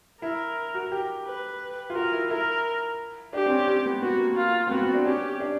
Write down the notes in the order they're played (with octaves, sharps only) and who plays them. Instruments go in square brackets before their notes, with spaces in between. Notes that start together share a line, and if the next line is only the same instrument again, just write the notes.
[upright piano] E4 [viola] A#4
[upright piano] F#4
G4
[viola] B4
[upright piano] F4
[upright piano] F#4 [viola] A#4
[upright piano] E4
[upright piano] E4 [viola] A#4
[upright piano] D4 [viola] G4
[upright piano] C4
C#4
C4
B3
[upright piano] B3 [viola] F#4
[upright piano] A#3
[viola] F4
[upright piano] C4
[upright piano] B3 [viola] F#4
[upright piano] C4
D4
[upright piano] C#4 [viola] G4
[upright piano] D4